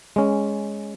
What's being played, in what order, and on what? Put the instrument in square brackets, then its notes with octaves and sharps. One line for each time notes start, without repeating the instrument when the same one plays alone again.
[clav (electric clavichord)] G#3 C#4